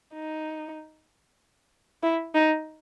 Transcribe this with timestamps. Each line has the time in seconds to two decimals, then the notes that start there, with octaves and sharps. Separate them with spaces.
0.15 D#4
2.03 E4
2.34 D#4